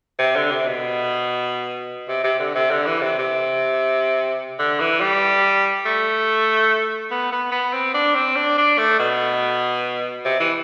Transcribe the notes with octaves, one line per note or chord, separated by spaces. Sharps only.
C3
D3
C3
B2
C3
C3
D3
C3
D3
E3
C3
C3
D3
E3
G3
A3
B3
B3
B3
C4
D4
C4
D4
D4
A3
B2
C3
E3